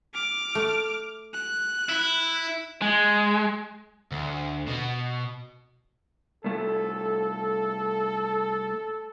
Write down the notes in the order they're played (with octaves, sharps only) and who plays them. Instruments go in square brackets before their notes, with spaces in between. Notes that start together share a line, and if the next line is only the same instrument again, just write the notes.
[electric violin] D6 F6
[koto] A3
[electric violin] F#6
[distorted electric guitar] E4
[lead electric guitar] G#3
[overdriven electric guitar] D2
B2
[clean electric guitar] C2 A3 [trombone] A4